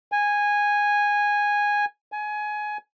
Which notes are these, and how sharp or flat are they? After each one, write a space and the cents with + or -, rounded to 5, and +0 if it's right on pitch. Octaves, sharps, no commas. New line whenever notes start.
G#5 -10
G#5 +20